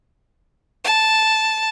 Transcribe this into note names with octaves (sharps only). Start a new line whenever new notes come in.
A5